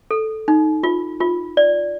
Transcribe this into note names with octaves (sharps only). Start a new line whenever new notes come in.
A4
D#4
F4
F4
D5